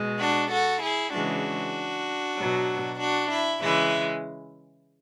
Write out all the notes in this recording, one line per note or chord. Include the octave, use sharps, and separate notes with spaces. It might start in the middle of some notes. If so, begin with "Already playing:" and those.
Already playing: B2 G#3
D4 F#4
F#4 A4
E4 G#4
C#3 E3 G#3 D4 F#4
B2 F#3
D4 F#4
E4
C#3 E3 G#3 E4